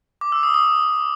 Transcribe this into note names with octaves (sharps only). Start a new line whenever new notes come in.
D6
E6
D#6
D#6